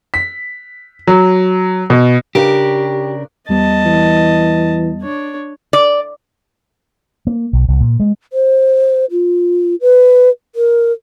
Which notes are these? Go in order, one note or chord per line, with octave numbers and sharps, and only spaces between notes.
B6
F#3
B2
C#3 D4 G4 A#4
E2 G3 B3 D#5 A5
E3
D4 C#5
D5
A#3
B1
C2
A#2
G#3
C5
F4
B4
A#4